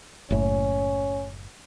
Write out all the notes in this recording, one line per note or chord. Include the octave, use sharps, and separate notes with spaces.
F#1 A2 C#4